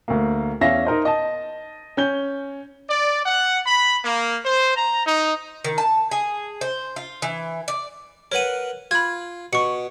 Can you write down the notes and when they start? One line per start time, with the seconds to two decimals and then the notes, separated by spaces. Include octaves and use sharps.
0.08 D2 A#3
0.61 E2 C#4 E5 F5 A#6
0.85 D#4 A#4 C5 D#5
1.05 D#5 A5
1.97 C#4 G6 G7
2.89 D5
3.25 F#5
3.64 B5
4.04 A#3
4.44 C5
4.76 A#5
5.06 D#4
5.64 D#3
5.78 A5
6.11 G#4
6.61 C5
6.96 F4
7.22 E3
7.68 D5
8.32 A#4 B4 C#5 F#5 D#7
8.91 F4 B5 G#6
9.53 B2 C#6 C#7